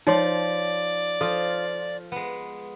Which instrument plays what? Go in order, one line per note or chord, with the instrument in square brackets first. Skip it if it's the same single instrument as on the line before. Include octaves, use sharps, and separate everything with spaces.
[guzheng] F3 [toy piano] D#4 C#5 C6 [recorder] D5
[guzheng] F3 F4 [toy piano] A4
[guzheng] G#3 B3